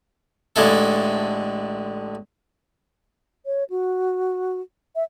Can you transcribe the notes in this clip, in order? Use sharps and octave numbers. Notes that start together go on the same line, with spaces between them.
A1 D3 G#3 E4 A4
C#5
F#4
E5